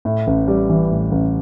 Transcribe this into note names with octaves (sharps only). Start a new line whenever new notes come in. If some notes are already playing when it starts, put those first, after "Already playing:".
A2
A1
G3
E3
A2
A1